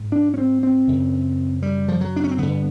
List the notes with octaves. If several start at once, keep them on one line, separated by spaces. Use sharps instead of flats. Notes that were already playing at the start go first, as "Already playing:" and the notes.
Already playing: G#2
D4
C#4
C4
C4
F#2 C#3
G3
F3
F#3
D4
C#4
C4
G2 D3 B3